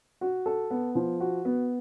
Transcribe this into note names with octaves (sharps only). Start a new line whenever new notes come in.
F#4
A4
B3
F3
F#4
B3